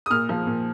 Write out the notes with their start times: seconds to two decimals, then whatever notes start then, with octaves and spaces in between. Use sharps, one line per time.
0.06 D#6
0.10 A#2 F6
0.29 F3
0.47 A#2